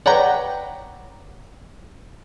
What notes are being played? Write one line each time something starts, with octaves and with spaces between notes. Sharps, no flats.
B4 C#5 D5 F#5 G5 A#5